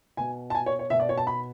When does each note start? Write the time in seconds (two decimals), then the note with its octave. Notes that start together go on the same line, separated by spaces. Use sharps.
0.17 B2 G#5
0.50 A5
0.55 G#5
0.66 C#5
0.79 C#5
0.90 B2 E5
1.00 D5
1.09 C#5
1.18 A5
1.27 B5